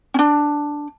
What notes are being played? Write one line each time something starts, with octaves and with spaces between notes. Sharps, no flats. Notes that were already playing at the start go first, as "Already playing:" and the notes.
C#4 D4